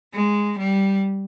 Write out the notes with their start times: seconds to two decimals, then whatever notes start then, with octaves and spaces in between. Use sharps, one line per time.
0.13 G#3
0.58 G3